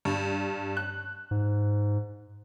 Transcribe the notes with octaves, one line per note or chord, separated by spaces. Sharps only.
G2
F#6
G#2